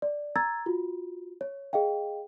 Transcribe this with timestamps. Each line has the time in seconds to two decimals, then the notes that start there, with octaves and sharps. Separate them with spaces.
0.02 D5
0.36 A#5 E6 G#6 A6
0.66 F4 F#4
1.41 C#5
1.73 G#4 D#5 F5 G5